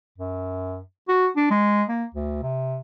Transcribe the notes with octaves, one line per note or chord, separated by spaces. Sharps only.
F#2
F#4
D4
G#3
A#3
D2
C3